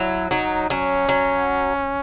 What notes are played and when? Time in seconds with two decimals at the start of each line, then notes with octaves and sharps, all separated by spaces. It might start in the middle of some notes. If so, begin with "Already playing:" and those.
Already playing: F#3 E4
0.31 F#3 D#4
0.70 F#3 C#4
1.09 F#3